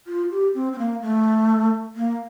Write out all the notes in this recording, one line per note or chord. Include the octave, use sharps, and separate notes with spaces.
F4
G4
C4
C4
A#3
A3
A#3